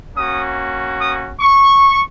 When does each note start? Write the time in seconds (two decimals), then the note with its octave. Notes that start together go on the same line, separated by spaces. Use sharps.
0.15 A#3 C#4 F#4 D#6
0.98 D#6
1.40 C#6